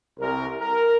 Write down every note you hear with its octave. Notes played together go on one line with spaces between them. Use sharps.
C2 A#4
A#4